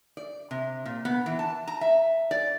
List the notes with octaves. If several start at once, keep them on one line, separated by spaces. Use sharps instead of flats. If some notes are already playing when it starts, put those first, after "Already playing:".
D5
C3
A#2
B3
E3
A5
A#5
E5
D5